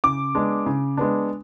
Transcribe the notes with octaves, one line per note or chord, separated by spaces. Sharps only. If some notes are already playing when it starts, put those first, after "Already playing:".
C#3 D6
G#3 B3 D4
C#3
G#3 B3 D4